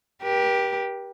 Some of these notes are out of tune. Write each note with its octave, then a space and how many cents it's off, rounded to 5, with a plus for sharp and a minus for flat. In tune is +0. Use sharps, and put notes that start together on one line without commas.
G4 +0 A#4 +45